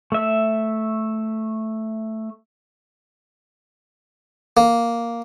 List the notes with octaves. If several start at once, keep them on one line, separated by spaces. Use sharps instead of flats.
A3 E5
A#3